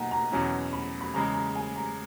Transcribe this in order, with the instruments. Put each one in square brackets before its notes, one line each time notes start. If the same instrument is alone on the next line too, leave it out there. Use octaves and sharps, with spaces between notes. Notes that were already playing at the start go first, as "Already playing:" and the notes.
Already playing: [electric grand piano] B2 A#3 D#4 [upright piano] F#5 G#5 A#5
[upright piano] A#5
[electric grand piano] E2 B2 F#3 C#4 E4 [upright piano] A#5
[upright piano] B5
B5
[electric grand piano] E2 C#3 G#3 [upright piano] A#5
[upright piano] A#5
G#5
A#5